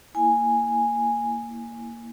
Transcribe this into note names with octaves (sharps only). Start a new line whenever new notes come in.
A#3 E4 G#5